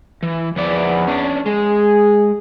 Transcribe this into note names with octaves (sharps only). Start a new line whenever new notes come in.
E3
E2 F3 B4 D5
C#4 D4
G#3 G#4